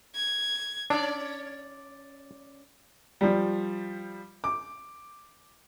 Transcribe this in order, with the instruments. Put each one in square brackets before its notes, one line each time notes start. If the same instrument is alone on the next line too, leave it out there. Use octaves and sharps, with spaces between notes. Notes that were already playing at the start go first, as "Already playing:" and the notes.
[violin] G#6
[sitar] C#4 D5 [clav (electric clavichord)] D4
[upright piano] F3 G3
D6